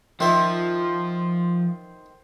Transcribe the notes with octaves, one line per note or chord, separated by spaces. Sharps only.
D#3 F3 C5 E5